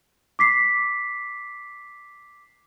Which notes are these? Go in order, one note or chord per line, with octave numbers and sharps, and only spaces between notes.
D6 B6 C7